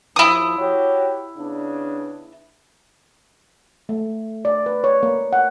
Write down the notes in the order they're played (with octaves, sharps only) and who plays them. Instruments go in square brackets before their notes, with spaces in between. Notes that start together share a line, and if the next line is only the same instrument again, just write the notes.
[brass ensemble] D#2 F3 [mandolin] E4 D#6
[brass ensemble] F#4 G4 C#5
C#3 B3 D4
[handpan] A3
D5
B4
C#5
A#3
F#5